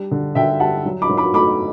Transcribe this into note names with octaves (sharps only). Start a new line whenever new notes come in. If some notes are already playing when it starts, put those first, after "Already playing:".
Already playing: G3 D4
D3
D3 E5 G5
G3 F#5 A5
F#3
B5 D6
F#3
B5 D6
A3 B5 D6